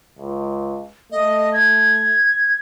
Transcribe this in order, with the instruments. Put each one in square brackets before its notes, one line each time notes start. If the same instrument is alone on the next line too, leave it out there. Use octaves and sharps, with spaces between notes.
[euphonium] C#2
[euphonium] A3 [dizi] D#5
[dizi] G#6